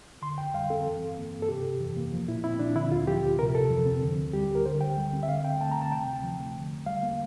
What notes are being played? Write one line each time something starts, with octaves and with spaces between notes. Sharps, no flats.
D3 C6
F2 G5
G3 F5
C4 A4
E3
G2
A#3
G2
A4
C3 G4
F2
E3
A#3
F3
A#2 E4
C4 E4
A#2 D4
D3 E4
D2 F4
F3 G4
D2
C3 A#4
F2 A4
F3
C4
D3
D2
G3 G4
D2
A#4
D3 C5
D2 G5
G3
C4
E5
D3 F5
D2 G5
A3 A5
A#5
C4
A5
C3 G5
D2
F3
A3
D3
E2
G3 F5
A#3